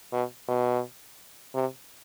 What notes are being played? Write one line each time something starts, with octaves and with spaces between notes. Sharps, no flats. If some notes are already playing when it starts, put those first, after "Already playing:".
B2
B2
C3